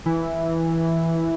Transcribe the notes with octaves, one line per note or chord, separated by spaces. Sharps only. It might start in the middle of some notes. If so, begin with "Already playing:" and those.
E3